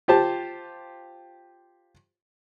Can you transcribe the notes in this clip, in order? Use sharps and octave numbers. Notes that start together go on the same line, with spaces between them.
F4 G4 C5 A5